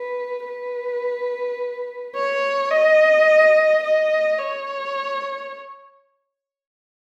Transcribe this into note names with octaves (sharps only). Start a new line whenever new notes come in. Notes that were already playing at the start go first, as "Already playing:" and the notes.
Already playing: B4
B4
C#5
D#5
D#5
C#5